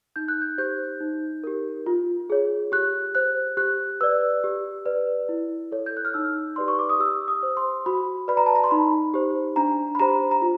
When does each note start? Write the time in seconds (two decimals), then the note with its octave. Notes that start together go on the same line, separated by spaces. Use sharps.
0.16 D#4 G6
0.28 F#6
0.42 G6
0.58 G4 C5 G6
1.00 D#4
1.44 G4 A#4
1.86 F4
2.30 G#4 C#5
2.72 G4 F#6
3.15 C5 F#6
3.57 G4 F#6
4.01 B4 D5 E6
4.44 G4
4.86 B4 D5
5.29 E4
5.72 A4 C#5
5.86 G6
5.97 F#6
6.05 F6
6.14 D#4 E6
6.56 G4 B4 D5 C6
6.68 C#6
6.79 D6
6.89 D#6
7.00 G4 E6
7.28 D#6
7.43 C5
7.57 C6
7.86 F#4 B5
8.28 B4 D5 B5
8.37 A#5
8.46 A5
8.55 A#5
8.64 C6
8.71 D#4 B5
9.14 G4 C5
9.56 D4 A#5
9.95 B5
9.99 G4 C5 A#5
10.31 A#5
10.42 F4